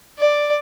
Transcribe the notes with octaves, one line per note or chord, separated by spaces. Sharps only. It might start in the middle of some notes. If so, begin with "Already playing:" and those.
D5